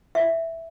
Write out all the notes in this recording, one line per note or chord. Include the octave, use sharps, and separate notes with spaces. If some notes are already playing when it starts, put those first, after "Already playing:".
E5